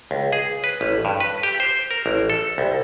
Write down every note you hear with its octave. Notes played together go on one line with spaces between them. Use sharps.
C#2
G#4
B4
A1
G2
B4
G4
C5
A#4
A1
A4
C2